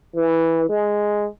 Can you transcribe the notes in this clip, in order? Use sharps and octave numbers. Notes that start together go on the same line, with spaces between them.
E3
G#3